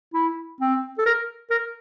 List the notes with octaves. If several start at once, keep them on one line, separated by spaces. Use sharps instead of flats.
E4
C4
A4
A#4
A#4